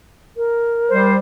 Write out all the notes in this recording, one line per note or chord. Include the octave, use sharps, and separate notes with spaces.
A#4
G3 C5